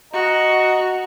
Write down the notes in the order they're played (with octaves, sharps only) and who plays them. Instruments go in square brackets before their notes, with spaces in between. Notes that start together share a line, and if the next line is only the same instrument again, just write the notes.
[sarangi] F#4 [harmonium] D#5 A#5